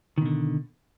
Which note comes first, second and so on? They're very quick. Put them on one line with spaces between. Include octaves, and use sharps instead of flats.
D#3 B2 D3